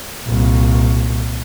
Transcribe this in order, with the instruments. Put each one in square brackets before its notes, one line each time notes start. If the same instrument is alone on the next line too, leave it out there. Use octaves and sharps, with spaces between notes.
[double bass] C2 A#2